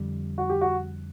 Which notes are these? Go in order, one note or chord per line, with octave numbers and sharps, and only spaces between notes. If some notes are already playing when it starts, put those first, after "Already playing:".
Already playing: F2 D3 G3
F#4
G4
F#4